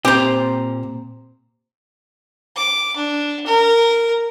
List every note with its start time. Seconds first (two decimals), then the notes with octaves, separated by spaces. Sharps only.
0.05 A#2 C4 G4 C5 A#5
2.56 D6
2.96 D4
3.46 A#4